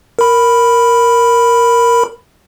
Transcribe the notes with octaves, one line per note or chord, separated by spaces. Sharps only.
A#4 B5